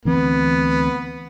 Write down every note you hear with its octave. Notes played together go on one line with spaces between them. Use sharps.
D2 E3 B3 C4